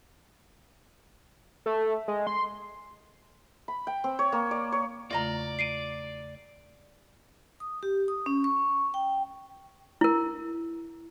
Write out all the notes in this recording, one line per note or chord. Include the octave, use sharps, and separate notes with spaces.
A3
G#3
C6
B5
G5
C4
C#5
A#3
D5
C#5
E2 C#3 A3 F4 D5 D#5 A#5
C7 D7 D#7
D#6
G4
D#6
C#4
C#6
G5
E4 A#4